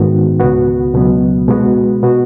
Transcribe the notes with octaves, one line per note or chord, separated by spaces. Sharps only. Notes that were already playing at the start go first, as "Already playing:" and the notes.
Already playing: G#2 D#3 G#3 B3 F#4
C#2 B2 B3 F#4
C#2 B2 F#3 B3
B2 G#3 B3 F#4
B2 B3 F#4